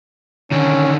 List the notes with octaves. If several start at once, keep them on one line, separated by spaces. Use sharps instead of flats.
D3 D#3 C#4